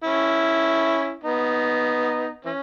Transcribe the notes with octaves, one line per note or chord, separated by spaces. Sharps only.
C#4 E4
B3 D#4
E3 C#4